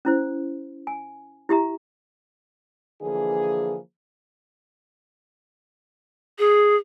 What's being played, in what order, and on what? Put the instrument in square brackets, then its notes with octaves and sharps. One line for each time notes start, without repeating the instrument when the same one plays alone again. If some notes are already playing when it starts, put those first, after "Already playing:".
[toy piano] C#4 E4 C5
G#5
E4 G4 E5 A#5
[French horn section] D3 E3 F3 A#3 G#4
[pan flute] G#4